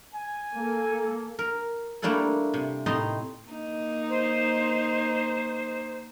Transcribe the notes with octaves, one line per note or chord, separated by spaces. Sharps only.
G#5
A#3 A4
A#4
G3 A3 A#3 D4 E4 A4
C3
A2 C4 D#4 D#5 A#5 C6
A#3 D#4
C5